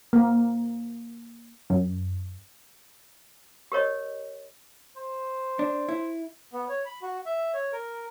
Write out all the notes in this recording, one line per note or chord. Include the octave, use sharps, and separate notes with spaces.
A#3
F#2
G4 A#4 C#5 D#5
C5
D4
E4
B3
C#5
B5
F#4
E5
C#5
A#4